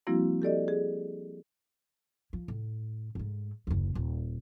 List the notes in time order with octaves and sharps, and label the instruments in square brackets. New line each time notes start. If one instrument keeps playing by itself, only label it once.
[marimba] F3 G3 A#3 C4 E4 F#4
G4 A4 D5 D#5
G#4
[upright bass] F3
A2
G#2 A3
F#1 D#2
D#1